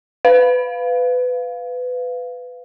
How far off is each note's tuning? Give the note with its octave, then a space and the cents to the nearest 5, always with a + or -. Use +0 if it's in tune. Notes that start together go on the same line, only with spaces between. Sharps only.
B4 +20 F5 +0